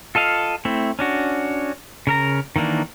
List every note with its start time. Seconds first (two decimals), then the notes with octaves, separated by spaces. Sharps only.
0.15 F4 A4 D#5 F5
0.65 A3 C4 E4
0.99 C#4 D4 F#4
2.07 C#3 A#4 A#5
2.56 D#3 E3 A#3 D4